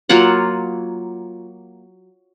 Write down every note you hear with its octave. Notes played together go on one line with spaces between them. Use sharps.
F#3 A#3 F4 F#5